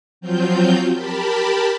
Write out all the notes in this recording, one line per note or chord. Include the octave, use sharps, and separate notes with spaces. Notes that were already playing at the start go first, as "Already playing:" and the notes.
F3 F#3 C4 F4 G6
G4 A#4 A5 B5